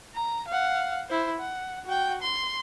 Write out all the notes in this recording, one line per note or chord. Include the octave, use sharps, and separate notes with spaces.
A#5
F5 F#5
E4 C5
F#5
F#4 G5
C6